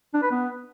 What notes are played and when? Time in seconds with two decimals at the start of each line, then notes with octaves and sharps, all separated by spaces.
0.14 D4
0.22 B4
0.31 B3